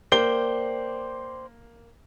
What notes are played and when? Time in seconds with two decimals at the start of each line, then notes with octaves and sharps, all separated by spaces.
0.12 A#3 C5 D5 G5 G7